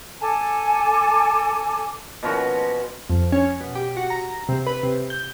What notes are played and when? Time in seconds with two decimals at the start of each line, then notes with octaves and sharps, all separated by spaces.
0.21 A4 G#5 A5 D6
2.23 B2 F3 C#4 F#4
3.10 F2
3.32 C#4
3.60 B2
3.75 G4
3.97 F#4
4.10 A#5
4.49 C3
4.66 B4
4.83 C3
5.10 G6